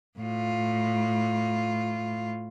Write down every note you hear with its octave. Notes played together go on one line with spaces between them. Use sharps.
A2 F4